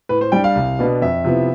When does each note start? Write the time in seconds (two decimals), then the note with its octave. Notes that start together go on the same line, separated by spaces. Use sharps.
0.09 A2 B4
0.21 C5
0.32 G3 D4 G5
0.44 F5
0.55 C2
0.79 B2 B3 D4
1.02 F2 E5
1.24 C3 F3 B3 E4